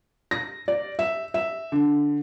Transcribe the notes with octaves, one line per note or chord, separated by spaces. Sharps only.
A#6
D5
E5
E5
D3